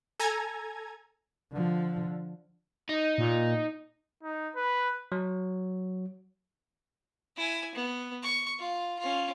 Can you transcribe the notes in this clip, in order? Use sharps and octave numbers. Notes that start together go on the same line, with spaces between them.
A4 G#5 A#5 G#6
D3 F3
D#4
A#2
D#4
B4
F#3
E4 G#5
B3
C#6
F4
C#4 F4